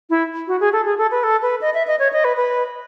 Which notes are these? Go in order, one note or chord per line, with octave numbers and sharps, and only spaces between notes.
E4
F#4
G#4
A4
G#4
A4
B4
A4
B4
D#5
E5
D#5
C#5
D#5
B4
B4